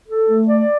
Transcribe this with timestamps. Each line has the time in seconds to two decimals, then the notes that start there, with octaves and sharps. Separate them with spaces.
0.09 A4
0.28 A3
0.48 D5